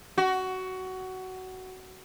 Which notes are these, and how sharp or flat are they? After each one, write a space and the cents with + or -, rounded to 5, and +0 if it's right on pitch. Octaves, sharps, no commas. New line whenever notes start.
F#4 +15